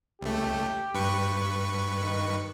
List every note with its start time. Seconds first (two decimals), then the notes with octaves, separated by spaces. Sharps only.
0.21 C#2 A3 G4
0.94 G2 B4 C#6
2.01 D#3